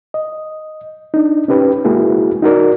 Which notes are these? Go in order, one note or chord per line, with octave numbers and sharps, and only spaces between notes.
D#5
D4 D#4
C#4 D#4 G4 B4
G#3 A#3 E4 F#4 G#4
D#4 F#4 A#4 D5